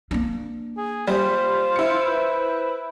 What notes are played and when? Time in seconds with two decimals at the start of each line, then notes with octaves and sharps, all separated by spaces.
0.11 A#3 D4
0.77 G#4
1.08 G3 F4 C5
1.76 E4 C#7
2.06 B4